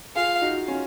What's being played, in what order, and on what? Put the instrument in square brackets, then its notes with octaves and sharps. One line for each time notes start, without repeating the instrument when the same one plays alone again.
[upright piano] F4 G#4 [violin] F5
[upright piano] D#4 F#4
C#4 F4